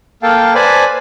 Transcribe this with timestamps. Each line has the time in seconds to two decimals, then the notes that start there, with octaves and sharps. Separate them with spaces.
0.23 A#3 A4 F5 G5 A5
0.55 B4 C5 D5 G#5 A5 B5